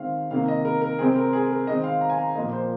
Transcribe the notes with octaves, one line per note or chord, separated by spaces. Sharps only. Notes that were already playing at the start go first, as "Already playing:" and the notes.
Already playing: D#3 G#3 C4 F5
C3 D#3 A#3 F5
D#5
A#4
A#4
C3 G#3 C4 G#4
A#4
G#4
A#4
D#3 G#3 C4 D#5
F5
A#5
G#5
A#5
A#2 F3 A#3 D#5
C5